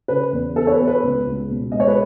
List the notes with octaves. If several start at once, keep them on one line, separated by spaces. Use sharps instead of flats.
C#3 B4
E2
B3 A4
C#5
B4
B3
B4
C#2
C#2
B2
G#3 D#5
C#5
B4